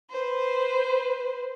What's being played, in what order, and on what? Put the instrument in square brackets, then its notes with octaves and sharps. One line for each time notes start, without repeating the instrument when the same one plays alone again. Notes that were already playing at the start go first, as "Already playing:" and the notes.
[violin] B4 C5